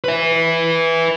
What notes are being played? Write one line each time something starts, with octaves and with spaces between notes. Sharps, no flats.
B4 E5